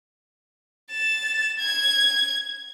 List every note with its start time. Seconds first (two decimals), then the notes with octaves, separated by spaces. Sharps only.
0.92 A6 E7
1.59 G#6